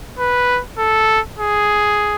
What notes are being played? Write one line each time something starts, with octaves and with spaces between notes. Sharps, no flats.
B4
A4
G#4